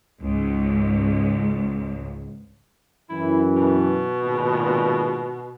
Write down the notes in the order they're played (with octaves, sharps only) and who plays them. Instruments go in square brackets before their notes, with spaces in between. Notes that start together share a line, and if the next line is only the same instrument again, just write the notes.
[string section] C#2 G#2
[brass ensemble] F#2 E3 [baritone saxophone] E4
[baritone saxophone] B2
[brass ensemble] G#1 A#2